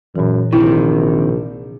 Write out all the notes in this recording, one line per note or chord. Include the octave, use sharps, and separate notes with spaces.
F#2 A#2 E3
A#1 C3 D#3 E4